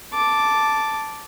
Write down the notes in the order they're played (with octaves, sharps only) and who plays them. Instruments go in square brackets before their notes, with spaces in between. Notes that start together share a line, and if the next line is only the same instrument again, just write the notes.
[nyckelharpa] A5 D6